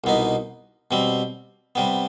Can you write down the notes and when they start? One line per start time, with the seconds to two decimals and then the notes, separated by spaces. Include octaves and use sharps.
0.04 C2 B2 B3 D#4
0.91 B2 G3 C4
1.75 C3 G3 B3